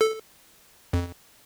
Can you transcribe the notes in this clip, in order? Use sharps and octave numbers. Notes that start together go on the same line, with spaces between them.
A4
F2